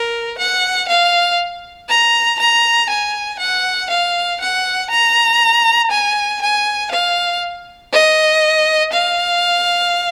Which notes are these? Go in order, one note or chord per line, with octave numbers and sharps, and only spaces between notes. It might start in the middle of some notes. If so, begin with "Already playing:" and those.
Already playing: A#4
F#5
F5
A#5
A#5
G#5
F#5
F5
F#5
A#5
G#5
G#5
F5
D#5
F5